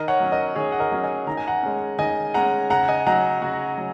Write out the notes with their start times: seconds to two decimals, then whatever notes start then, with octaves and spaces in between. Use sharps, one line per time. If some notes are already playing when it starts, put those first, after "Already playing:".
Already playing: D#3 A#4 D#5
0.08 C#5 F#5
0.20 F#3 C#4
0.32 A#4 D#5
0.56 D#3 G#4 C#5
0.72 F#5
0.80 A#4 D#5
0.92 F#3 C#4
1.04 D#5 G#5
1.27 D#3 A#5
1.37 G#5
1.47 F#5 A#5
1.63 G#3 C#4
1.99 D#3 D#5 G#5
2.34 G#3 C#4 F#5 A#5
2.70 C#3 F#5 A#5
2.88 D#5 G#5
3.06 F#3 D#4 F#5 A#5
3.42 C#3 F#4
3.77 F#3